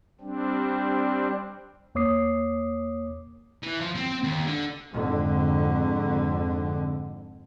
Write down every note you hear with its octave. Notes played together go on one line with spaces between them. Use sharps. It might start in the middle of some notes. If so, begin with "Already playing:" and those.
G3 C4 D4
E2 A#3 C#5 D6 D#6 C7
E3
F3
C4
D#2
D3
F2 G#2 D3